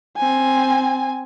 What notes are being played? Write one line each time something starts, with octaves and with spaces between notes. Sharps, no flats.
C4 G#5